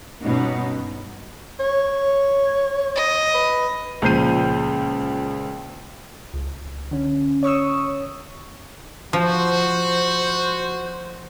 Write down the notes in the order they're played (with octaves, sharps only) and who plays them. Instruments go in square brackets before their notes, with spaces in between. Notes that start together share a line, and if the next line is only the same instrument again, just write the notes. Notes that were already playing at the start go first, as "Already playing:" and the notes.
[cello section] G2 B2 C#4 D#4
[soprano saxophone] C#5
[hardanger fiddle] D#5
[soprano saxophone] B4
[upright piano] C#2 A#2 F3 G6 C7 D#7
[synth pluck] C#2
D3 C#4
C#5 C#6 D#6 E6
[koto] F3 [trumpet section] F#4 [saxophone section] C5